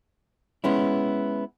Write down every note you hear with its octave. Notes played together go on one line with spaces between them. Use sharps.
G#3 B3 C#4 E4